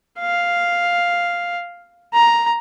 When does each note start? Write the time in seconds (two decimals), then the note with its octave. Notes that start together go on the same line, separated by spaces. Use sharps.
0.20 F5
2.14 A#5